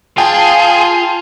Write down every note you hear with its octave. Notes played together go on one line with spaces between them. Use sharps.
F4 G#4 G5 A5